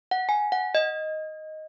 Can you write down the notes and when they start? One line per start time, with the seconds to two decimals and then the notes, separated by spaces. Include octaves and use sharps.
0.11 F#5
0.29 G#5
0.52 F#5
0.75 D#5